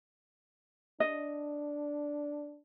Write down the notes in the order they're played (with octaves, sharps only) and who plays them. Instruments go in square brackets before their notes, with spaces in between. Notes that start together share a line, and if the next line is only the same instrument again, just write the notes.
[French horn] D4 [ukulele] D#5